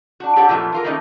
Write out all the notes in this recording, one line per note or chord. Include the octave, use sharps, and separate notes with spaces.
D4 F#4
D4 G4 A4 C#5 F#5
F2 A#2 D#3 E3 A3 F4
E3 F4 A#4
D#3 E3 A3 A#3 C#4 D#4